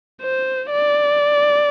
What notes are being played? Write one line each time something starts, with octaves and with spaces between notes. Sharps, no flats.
C5
D5